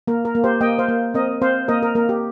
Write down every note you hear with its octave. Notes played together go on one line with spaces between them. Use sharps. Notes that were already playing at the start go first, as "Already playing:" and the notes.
A#3 A#4
A#4
A#3
G4 C5
A#3 D#5 G5
C5 F5
A#3
C4 A#4 D#5
C4 C5 F5
A#3 A#4 D#5
A#4
A#3 A#4
G4